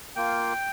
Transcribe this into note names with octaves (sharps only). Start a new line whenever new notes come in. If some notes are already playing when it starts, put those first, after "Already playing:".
A#3 F4 G5